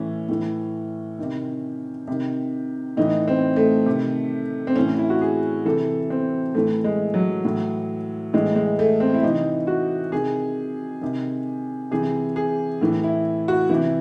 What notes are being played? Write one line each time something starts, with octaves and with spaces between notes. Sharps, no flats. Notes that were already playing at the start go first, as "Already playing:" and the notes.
Already playing: A2 E3 C#4
A2 E3
C3 D#3
C3 D#3
A2 E3 D#4
C4
A3
C3 D#3
C4
A2 E3 C#4
E4
F#4
G#4
C3 E3 A4
C4
A2 E3 A3
G#3
F#3
A2 E3
A2 E3 G#3
G#3
A3
C4
E4
C3 E3 D#4
F#4
C3 D#3 G#4
C3 D#3
C3 E3 G#4
G#4
A2 E3
E4
F#4
C3 E3 E4